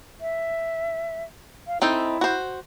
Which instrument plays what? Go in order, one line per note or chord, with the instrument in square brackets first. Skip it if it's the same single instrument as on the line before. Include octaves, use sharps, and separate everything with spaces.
[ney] E5
F5
[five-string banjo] C4 D#4 A4 [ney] E4
[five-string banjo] F#4 C5